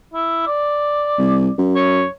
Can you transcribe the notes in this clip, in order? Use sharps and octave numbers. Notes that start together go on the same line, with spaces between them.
E4
D5
C2
F#2
C#5